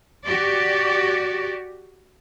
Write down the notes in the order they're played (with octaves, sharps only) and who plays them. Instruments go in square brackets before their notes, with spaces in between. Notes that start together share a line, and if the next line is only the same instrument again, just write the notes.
[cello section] F#4 G4 D5